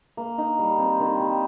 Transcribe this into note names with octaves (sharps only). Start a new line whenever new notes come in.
A#3
D#4
G3
C4
D#3
G3